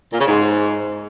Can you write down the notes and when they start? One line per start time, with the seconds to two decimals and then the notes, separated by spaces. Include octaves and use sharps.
0.13 A#2
0.20 C#3
0.27 G#2